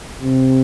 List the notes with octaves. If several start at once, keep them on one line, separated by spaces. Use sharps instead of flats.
C3